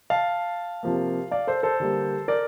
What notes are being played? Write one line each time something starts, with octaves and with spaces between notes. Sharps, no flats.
F5 A5
C3 F3 A#3
D5 F5
A4 C5
A4 C5
D3 G3 A#3
A#4 D5